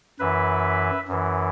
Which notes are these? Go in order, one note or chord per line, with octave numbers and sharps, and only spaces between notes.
F#2 E3 B4 E5
F#2 E3